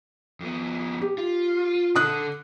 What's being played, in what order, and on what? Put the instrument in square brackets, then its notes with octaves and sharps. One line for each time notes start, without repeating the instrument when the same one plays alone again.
[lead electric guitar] F2 B3
[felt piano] G4
[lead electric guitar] F4
[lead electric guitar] D3 A4 [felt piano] D#6 F#6